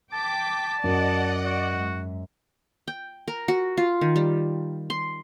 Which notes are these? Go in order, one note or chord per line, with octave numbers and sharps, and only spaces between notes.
G5 A5 D6 B6
F#2 D5 D#5 F#5
F#4
G#2
G5
A#4
F#4
F4
D#3
G3
C6